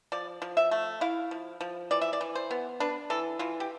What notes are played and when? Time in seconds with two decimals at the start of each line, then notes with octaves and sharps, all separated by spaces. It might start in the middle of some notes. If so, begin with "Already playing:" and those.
0.12 F3 D5
0.42 F3
0.57 E5
0.71 A3
1.01 E4 F5
1.31 F3
1.61 F3
1.91 E3 D5
2.02 E5
2.13 D5
2.21 E3
2.35 C5
2.51 B3
2.80 D4 B4
3.10 E3 A4
3.39 E3 F4
3.60 G4